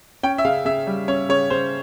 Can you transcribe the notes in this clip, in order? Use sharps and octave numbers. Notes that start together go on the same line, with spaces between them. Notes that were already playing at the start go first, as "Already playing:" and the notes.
C#4 G5
E5
C#3 F5
C#3 E5
G3
C#4 C#5
C#3 C#5
C#3 C5